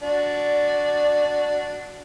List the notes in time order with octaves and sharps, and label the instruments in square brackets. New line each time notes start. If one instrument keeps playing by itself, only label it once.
[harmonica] D4 F#4 [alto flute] D5